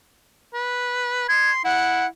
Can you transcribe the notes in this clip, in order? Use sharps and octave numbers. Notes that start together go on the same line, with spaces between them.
B4
C6 G#6
E4 F#5